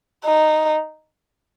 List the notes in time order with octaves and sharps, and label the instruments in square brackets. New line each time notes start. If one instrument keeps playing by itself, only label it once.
[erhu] D#4